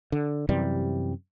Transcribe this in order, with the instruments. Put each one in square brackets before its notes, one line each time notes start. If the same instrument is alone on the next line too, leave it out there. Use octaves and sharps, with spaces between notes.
[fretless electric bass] D3
F#2 C3 E3 G3